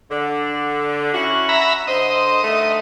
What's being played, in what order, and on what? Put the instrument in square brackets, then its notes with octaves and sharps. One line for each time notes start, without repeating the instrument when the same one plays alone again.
[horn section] D3
C#4 E4 F#4
[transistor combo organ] E5 A#5 B5
[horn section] D3 C5 [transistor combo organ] D#5
[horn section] D3 D#3 A3